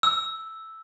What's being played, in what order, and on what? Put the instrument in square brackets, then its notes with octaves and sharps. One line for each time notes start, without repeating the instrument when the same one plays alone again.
[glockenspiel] E6